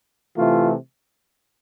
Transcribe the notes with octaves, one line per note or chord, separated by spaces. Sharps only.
C3 E3 A3 F4